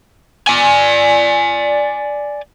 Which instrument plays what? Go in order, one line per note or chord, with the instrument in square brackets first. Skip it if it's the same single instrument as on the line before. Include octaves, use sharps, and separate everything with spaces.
[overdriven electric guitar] D5 G#5